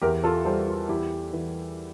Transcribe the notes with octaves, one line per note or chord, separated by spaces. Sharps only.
E2 G4 A#4
F4 A4
G3 A4 C5
F4
E2 E4 G4
E3